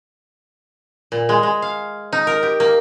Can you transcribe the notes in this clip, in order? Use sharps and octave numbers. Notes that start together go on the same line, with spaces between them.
A#2
G#3
G#3
F5
D#4
A#4
G4
A#3